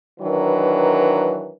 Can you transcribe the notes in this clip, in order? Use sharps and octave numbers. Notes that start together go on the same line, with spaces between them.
D#3 E3 F#3 D4 A#4 B4